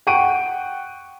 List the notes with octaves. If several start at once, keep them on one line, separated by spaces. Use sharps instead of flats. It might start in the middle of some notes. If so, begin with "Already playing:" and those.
F#5 G5 C#6 D7 D#7